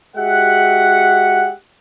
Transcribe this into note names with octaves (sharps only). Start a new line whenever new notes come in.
G#3 F#4 G4 E5 F#5